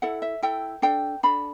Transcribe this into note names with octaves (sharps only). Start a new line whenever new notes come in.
E4 A4 F#5
E5
E4 A4 G5
D4 A4 G5
D4 A4 B5